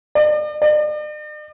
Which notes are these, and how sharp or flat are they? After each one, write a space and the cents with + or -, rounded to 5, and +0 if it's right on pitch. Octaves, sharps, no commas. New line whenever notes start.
D5 +45
D5 +45